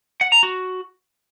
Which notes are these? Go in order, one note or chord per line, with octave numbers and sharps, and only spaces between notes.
F#5
A#5
F#4